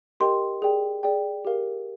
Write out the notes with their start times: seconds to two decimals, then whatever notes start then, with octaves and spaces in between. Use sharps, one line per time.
0.20 G4 A#4 D#5 G5 C6
0.62 G#4 D5 G5
1.03 G#4 D5 G5
1.45 G4 A#4 F5